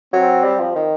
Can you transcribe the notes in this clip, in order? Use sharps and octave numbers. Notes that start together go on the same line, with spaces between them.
F#3 C4
G3
F3
D#3